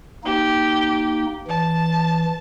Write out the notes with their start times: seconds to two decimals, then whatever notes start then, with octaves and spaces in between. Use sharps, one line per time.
0.24 A#3 D#4 G4
1.47 E3 A5